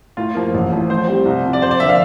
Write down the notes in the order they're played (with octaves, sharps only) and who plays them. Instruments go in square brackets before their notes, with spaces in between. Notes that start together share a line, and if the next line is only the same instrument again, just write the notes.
[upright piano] A2 [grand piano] F4
[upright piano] F3 A#3
A1
A2 F3 A3
[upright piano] A2 [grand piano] C5
[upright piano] G3 C4 G4
C2
C3 F3
[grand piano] D5
[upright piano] F2 [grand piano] C5
[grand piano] D5
[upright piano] D3 F3 A#3 [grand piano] E5
[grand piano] F5